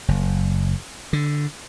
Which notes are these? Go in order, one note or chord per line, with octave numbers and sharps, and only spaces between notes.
F#1
D3